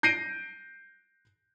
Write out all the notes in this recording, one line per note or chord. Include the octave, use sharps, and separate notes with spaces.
G6 A#6 C7 D7 D#7